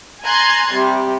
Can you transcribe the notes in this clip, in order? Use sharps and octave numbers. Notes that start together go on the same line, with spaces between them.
G#5 A#5 C6 F#6 G#6 A6
C3 G3